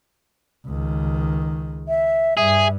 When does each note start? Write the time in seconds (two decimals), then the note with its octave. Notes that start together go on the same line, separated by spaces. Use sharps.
0.66 C#2 D#3
1.88 E5
2.37 G2 G#4 E5